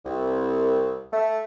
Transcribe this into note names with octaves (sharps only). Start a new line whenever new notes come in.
C2
A3